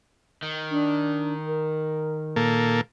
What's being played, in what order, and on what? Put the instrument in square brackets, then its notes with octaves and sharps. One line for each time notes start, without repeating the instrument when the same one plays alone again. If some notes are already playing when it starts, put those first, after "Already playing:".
[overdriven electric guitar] D#3
[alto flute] D4
A#4
[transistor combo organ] A#2 A#3 A4